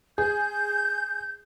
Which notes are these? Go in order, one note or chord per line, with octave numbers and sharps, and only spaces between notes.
G#4 G6